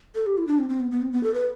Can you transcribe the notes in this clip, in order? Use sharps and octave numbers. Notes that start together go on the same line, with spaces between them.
A4
G4
E4
D4
C4
C4
B3
B3
C4
B3
A4
B4